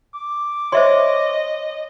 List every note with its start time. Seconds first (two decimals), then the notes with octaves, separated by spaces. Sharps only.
0.14 D6
0.72 C5 C#5 D#5 E5 C6